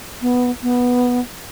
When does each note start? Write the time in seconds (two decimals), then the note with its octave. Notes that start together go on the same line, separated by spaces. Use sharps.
0.22 B3
0.63 B3